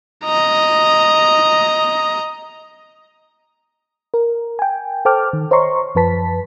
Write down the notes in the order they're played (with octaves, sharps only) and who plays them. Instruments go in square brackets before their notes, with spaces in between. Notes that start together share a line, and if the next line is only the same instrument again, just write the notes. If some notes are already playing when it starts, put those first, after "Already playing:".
[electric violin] D#5 A#5
[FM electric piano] A#4
G5 G#5
A4 C5 G5 A5 D6 F6
D#3
C5 C#5 D#5 A#5 C6 C#6
F#2 F3 B4 A5 B6